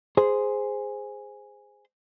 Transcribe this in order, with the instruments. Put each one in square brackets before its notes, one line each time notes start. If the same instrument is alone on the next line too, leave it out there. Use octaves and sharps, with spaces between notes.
[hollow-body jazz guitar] G#4 C5